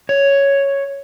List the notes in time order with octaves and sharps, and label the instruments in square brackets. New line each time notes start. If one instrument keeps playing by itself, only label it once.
[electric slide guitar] C#5